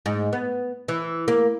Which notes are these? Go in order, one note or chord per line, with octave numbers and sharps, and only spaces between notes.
G#2
B3
E3
A#3